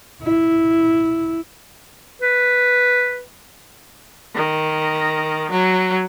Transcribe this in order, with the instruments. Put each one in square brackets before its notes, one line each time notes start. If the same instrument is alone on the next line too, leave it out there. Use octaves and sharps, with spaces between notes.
[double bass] E4
[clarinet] B4
[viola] D#3
F#3